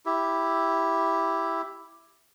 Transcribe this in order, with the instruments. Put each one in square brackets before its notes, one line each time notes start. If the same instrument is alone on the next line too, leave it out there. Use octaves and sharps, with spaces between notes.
[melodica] E4 G4